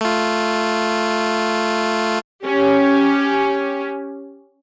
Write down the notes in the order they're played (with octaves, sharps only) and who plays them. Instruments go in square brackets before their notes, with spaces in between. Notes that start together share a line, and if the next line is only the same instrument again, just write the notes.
[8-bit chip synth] A3 F4
[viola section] C#4 G4